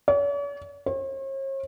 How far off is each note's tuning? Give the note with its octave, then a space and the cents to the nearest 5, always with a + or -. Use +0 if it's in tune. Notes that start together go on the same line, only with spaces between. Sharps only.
C#5 +45
C#5 -45